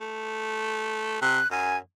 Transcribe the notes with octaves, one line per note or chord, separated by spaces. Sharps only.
A3
C3 F#6
F#2 G#5